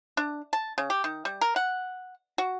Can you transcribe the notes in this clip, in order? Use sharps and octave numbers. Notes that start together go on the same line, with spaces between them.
D4
A5
C#3
G4
D#3
G3
A#4
F#5
F#4